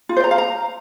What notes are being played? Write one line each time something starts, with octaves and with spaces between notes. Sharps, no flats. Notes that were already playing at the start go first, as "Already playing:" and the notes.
F4
C5
A#5
F5
A#5